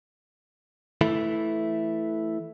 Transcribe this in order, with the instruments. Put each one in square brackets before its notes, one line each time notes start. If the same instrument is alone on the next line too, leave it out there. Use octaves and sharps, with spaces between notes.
[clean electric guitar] E3 A3 E4